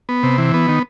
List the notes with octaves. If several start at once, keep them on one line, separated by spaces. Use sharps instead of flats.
B3
C3
E3
B3
D#3